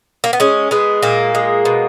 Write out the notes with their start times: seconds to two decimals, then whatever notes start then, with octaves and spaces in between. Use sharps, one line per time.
0.24 A#3
0.33 B3
0.40 G#3 C#4
0.71 G#3 B3
1.03 A#2 A#3
1.35 G#3
1.65 B2